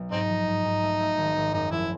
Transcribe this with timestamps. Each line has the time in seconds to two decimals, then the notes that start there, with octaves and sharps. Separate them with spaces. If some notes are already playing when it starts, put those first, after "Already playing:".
Already playing: B1 B2 F#3
0.11 G#2 C4 D#4
0.29 F3
0.48 G#2
0.65 G#2
0.83 A3
1.00 A3
1.18 G#1
1.36 G#1
1.53 F#2 D#4
1.71 F3 E4